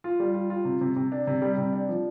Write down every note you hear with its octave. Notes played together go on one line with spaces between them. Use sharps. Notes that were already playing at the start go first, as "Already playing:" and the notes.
F4
G3
F4
F4
C3
C3
C3
D4
C3
G3
C3
D4
F3